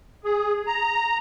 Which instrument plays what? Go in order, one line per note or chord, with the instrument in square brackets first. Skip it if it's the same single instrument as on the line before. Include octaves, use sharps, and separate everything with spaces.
[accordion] G#4
A#5